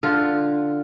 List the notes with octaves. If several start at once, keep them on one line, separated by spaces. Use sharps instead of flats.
D3 F4